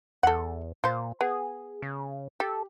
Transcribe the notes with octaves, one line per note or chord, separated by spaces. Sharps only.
E2 A4 F#5
A#2 F4 C5
B3 G#4
C#3
G4 A4